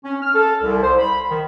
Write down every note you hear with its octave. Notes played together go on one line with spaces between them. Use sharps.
C#4
F6
A4
C2
C5
B5
D#3